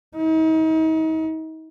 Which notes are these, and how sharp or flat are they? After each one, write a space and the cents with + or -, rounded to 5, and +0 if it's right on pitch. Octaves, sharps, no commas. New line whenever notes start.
D#4 +40